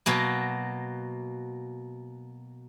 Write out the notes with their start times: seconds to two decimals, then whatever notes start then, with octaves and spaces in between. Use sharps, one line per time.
0.06 B2 F#3 A#3